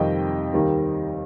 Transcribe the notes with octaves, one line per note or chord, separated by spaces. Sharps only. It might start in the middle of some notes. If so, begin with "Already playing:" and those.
Already playing: F2 C3 D#3 G3 D#5 G5
D#2 D#3 G3